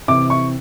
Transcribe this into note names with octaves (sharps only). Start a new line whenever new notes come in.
C3 E3 D6
C#6